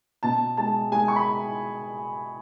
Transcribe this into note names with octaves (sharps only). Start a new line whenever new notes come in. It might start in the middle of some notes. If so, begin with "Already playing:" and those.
B2 A5
G#3 A5
G#3 G#5
C#6
B5